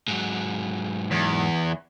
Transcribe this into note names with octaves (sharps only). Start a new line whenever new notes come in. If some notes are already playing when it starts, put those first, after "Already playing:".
G#2 F#3
E2